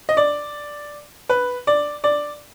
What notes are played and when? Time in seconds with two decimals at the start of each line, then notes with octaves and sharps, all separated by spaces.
0.09 D#5
0.17 D5
1.29 B4
1.67 D5
2.04 D5